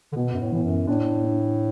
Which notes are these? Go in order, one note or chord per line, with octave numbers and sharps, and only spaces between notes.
D3
B2 B3
F#2
A2
A2 E3
F#2
A2 D4
D4